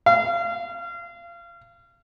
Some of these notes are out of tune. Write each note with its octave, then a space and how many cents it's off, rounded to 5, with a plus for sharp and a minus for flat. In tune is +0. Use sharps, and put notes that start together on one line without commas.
F5 -30